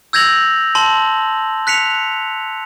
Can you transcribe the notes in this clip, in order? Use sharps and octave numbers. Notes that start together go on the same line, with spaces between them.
E6 G6 G#6 A#6 F7 F#7
A5 C6 F#7
F#6 B6 C#7 F7